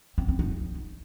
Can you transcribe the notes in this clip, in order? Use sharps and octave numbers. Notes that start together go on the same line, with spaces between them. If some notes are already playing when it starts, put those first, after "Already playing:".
C4
C4
D#4